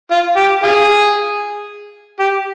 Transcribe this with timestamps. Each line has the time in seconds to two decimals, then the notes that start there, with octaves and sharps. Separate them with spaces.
0.11 F4
0.37 G4
0.63 F4 G#4
2.19 G4